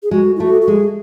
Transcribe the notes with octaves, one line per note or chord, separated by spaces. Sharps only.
G#4
G#3 F#4
E4
A3 F#4
F#4
G#3 G#4